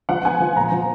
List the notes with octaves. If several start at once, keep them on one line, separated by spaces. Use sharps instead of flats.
F3 F#5
B3 G#5
F3
A#2 A#5
F3